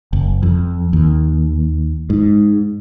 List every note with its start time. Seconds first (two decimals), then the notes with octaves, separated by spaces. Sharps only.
0.13 F#1
0.43 F2
0.93 D#2
2.10 G#2